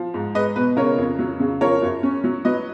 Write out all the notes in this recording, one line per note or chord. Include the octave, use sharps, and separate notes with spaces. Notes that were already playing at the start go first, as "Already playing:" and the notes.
Already playing: F3
G#2
G#3 B4 D#5
B2 B4
C#3 A#4 C#5
F2
F#3
C#3
F3 A#4 C#5
F#2
C#4
F#3
F#3 B4 D#5